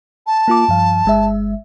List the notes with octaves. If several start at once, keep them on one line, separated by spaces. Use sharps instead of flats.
A5
A#3 F4 D6
G2 F3 F5
G1 G#3 E5